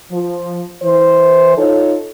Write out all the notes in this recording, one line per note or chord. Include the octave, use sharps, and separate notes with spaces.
F3
E3 C5
D#4 F4 A4 C#5